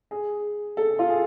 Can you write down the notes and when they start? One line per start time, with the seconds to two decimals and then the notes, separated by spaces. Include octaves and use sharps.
0.11 G#4
0.77 A4
0.99 F4
1.09 G#4